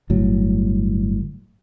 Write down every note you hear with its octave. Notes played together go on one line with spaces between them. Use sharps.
G1 A2 F#3